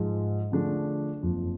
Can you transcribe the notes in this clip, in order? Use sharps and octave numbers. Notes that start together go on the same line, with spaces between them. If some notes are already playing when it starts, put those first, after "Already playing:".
Already playing: G#2 F3 G#3
D3 F3 A3 D4 G#4
F#1 F2 F3